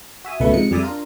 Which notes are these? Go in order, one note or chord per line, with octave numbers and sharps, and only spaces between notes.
F#4 E5 G#5 D#6
C#2 B2 A3 B4 E5 C#6
G#2 C3 F3 D#4 C#7
F2 G3 G#4 D5 E5 D#6
D4 F4 A#4